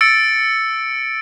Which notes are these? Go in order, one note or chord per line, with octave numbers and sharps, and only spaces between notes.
E6 A6 C#7 D7